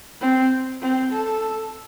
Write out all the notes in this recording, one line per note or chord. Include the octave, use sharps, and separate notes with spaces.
C4
C4
A4